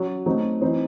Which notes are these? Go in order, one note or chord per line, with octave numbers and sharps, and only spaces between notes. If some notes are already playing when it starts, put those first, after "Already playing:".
Already playing: F#3 C#4 F#4
F#3 A3 C4 D#4
E3 C4 D#4